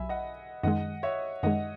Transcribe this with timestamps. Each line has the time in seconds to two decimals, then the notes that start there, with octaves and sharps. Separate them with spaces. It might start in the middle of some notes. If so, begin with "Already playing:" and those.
Already playing: B1 F#3 E5 G#5 B5
0.09 D#5 F#5
0.63 F#2 D#3 G#3 D#5 F#5
1.03 C#5 E5
1.43 F#2 D#3 G#3 D#5 F#5